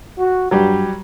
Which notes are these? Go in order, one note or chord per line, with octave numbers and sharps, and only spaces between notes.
F#4
G2 F#3 G3 G4